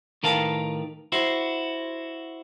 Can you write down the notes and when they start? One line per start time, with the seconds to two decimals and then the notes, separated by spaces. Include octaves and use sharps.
0.23 A2 D#3 A#4 B4 F5 A5
1.12 E4 F#4 C5